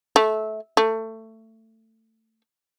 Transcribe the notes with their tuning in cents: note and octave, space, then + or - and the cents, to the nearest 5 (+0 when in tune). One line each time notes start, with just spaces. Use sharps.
A3 -20
A3 +20